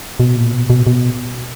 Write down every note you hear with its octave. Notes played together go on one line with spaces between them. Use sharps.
B2
A#2
B2
B2
B2